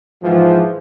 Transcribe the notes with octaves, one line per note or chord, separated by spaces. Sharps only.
G#2 E3 F3